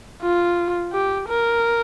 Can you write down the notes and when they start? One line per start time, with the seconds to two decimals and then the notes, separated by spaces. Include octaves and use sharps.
0.22 F4
0.93 G4
1.28 A#4